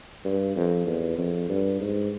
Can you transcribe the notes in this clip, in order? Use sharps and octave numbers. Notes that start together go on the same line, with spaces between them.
G2
F2
E2
F2
G2
G#2